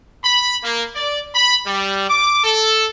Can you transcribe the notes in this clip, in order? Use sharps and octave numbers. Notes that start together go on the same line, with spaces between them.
B5
A#3
D5
B5
G3
D6
A4